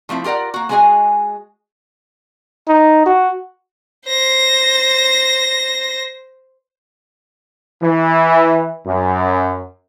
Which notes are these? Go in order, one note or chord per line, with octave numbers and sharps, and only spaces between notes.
F3 A3 C4 E4
F4 G4 A#4 D5 F#5
A#3 F#4
G#3 B3 F#4 G#4 D#5 G#5
D#4
F#4
C5 A#6
E3
F#2